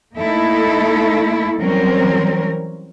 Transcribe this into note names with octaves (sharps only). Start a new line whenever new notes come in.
A3 A#3 D#4 E4 A4
E3 F#3 G3 C4 C#4 A#4